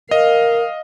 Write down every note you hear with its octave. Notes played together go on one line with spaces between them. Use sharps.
A#4 D#5 F5